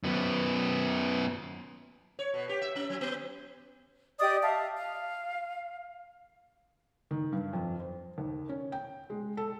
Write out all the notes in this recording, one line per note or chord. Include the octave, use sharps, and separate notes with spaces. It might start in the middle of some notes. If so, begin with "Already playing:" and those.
F#2 B3
C#5
B2
G4
E5
C#4
F#3
B3
G4 D5 D#5 D#6
E5 F5 A5
F5
D#3
G2
F2
C5
D#2
C#4
G5
G#3
A4